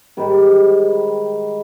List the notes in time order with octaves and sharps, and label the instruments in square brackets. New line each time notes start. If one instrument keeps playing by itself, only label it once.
[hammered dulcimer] G#2 D#3 G3